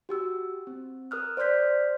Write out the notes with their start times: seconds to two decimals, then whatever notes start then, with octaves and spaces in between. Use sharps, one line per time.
0.09 F#4 G4 E6
0.67 C4
1.11 A#4 D#6 F6 F#6
1.37 C5 D5 C6 F6 G6 B6